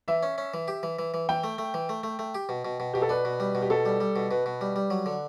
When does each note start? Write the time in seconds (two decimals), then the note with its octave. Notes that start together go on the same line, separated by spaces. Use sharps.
0.08 E3 E5
0.23 C#4
0.38 C#4
0.54 E3
0.68 G4
0.83 E3
0.99 E3
1.14 E3
1.29 E3 G5
1.44 A3
1.58 A3
1.74 E3
1.89 A3
2.03 A3
2.19 A3
2.35 G4
2.49 B2
2.65 B2
2.80 B2
2.94 B2 G4
3.02 A4
3.09 D4 B4
3.25 B2
3.40 G3
3.55 B2
3.62 G4
3.70 B2 A4
3.85 G3
4.01 G3
4.16 B2
4.31 B2 B4
4.46 B2
4.61 G3
4.76 G3
4.90 F#3
5.06 D3